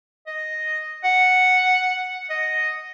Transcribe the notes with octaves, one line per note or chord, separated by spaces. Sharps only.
D#5
F#5
D#5